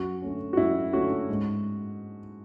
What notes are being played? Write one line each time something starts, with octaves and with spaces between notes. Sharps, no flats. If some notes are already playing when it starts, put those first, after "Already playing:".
Already playing: F#2 F#4
D3 A3 C#4
F#4
F#2 E4
D3 A3 C#4 F#4
G#2